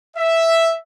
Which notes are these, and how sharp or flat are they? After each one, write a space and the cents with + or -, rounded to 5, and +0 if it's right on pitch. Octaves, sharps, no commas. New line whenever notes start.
E5 +0